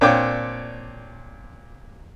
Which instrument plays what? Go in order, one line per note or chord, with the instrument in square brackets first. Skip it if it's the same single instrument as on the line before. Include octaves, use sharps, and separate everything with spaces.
[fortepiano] A#2 C4 D4 C#5 G5 D6